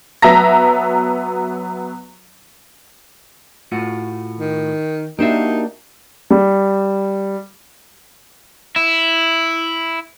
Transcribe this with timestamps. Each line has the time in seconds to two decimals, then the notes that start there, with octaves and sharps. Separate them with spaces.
0.22 F#3 B3 E5 A5 A#5 A#6
3.72 A2 F4 F#4
4.39 D#3
5.19 A#3 D4 D#4 F#4 G4 C5 E5
6.30 G3
8.76 E4